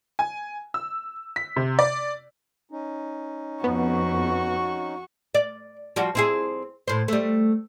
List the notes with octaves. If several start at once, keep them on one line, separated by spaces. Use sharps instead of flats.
G#5
E6
B6
C3
D5
C#4 D#4
F2 B3 F#4 C#6
D5
F3 G3 F#4
C4 E4 G#4
A2 C5
G3 A3